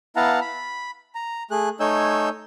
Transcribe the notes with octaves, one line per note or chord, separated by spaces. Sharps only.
B3 E4 F5 F#5 A5 A#5
B5
A#5
A3 G#4 F#6
A3 D#4 C#5 G#5 E6 G6